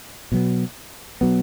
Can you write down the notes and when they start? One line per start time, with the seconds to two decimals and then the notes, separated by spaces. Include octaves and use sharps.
0.32 B2 F#3 B3
1.21 B2 F#3 B3